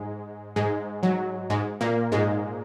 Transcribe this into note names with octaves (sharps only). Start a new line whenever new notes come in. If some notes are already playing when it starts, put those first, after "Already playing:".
Already playing: G#2 G#3
G#2 G#3
F#3
G#2 G#3
A#2 A#3
G#2 G#3